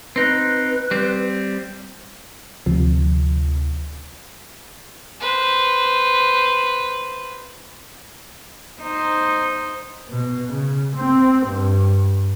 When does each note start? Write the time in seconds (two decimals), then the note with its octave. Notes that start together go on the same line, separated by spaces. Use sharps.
0.16 C4 D#4 B4
0.91 G3 C4
2.66 D2 C3 F3
5.20 B4 C5
8.82 D#4 C5
10.10 B2
10.53 C#3
10.96 C4
11.46 G2